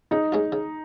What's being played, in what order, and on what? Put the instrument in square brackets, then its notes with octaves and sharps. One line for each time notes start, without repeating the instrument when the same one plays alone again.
[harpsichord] C#3 [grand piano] D#4
[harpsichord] G#3 C#4 F4
C#3